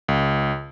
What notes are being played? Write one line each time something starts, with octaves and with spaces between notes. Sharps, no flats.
C#2